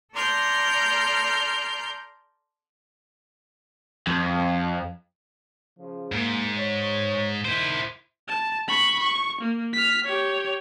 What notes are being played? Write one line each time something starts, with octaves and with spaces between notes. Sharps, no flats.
A4 D5 A#5 C6 F6 G6
F2
C#3 F3
G#2 A#3
C#5
D#3 E4 C5
A5
B5 C#6
C#6
A#3
F6 B6
G4 C#5